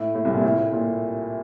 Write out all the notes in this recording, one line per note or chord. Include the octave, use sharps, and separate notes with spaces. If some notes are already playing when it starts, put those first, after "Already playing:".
Already playing: A2
A2
C2 C3
A#2
A2
A2
A#2